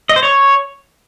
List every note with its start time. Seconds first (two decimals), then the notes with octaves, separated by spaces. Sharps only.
0.09 D#5
0.16 C5
0.23 C#5